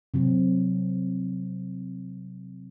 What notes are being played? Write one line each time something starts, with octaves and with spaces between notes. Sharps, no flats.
C3 F#3 C4